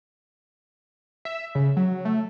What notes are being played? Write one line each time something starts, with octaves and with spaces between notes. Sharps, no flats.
E5
C#3
F#3
A3